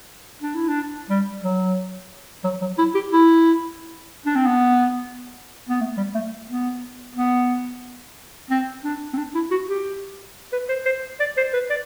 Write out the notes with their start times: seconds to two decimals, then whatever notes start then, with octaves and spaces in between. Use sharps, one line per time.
0.42 D4
0.55 E4
0.68 D4
1.10 G3
1.43 F#3
2.44 F#3
2.61 F#3
2.78 E4
2.95 G4
3.12 E4
4.26 D4
4.36 C4
4.46 B3
5.69 B3
5.81 A3
5.97 G3
6.14 A3
6.49 B3
7.15 B3
8.50 C4
8.84 D4
9.13 C4
9.17 D4
9.34 E4
9.51 F#4
9.68 G4
10.52 B4
10.69 C5
10.85 C5
11.20 D5
11.37 C5
11.53 B4
11.70 D5